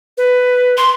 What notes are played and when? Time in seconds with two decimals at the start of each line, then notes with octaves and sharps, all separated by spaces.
0.17 B4
0.77 C6